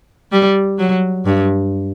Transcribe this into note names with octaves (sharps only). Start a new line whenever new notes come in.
G3
F#3
G2